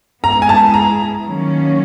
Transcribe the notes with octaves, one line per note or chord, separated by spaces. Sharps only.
G#3 B3 E4 G#4 A#5
G#5
A5
A#5
D#3 F#3 A#3 C#4